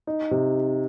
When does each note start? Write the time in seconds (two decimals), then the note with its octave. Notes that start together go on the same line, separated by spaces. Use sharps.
0.07 D#4
0.31 C3